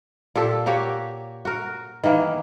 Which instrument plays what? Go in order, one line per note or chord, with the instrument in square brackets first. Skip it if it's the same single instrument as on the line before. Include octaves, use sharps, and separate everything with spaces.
[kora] A#2 G4 A4
A#3 F#4 G4 C#5
F#4 A#4
D#3 E3 A#3 B3